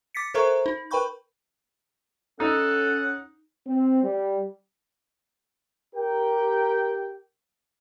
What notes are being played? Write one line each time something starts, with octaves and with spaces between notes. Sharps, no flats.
D6 A6 B6 C#7
A4 A#4 C5 E5 A#5 C#6
D#4
A#4 B4 G5 B5 C#6 G6
C#4 D#4 A4 F#5
C4
G3
G4 A#4 G5